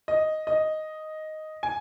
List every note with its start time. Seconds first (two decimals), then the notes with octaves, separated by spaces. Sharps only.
0.08 D#5
0.47 D#5
1.63 G#5